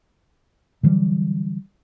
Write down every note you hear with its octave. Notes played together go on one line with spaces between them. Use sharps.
D3 E3 F#3 G3